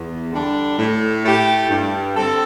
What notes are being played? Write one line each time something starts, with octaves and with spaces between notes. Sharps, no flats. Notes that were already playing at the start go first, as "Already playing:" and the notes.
Already playing: E2
D3 G3 D4
A2
A3 E4 G4
G2
D3 C4 A4